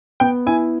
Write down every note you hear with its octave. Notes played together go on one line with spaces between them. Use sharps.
B3 G5
E4 G#5